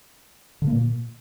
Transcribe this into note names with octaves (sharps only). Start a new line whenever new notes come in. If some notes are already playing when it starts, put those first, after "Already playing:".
D3
A#3
A#2